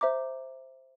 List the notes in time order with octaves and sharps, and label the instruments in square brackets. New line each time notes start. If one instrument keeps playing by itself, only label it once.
[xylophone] C5 E5 A#5 D6